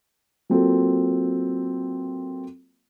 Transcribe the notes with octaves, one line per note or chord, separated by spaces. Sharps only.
F#3 A#3 C4 F4 A4